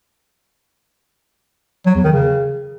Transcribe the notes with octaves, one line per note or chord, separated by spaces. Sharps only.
F#3
E2
D#3
C#3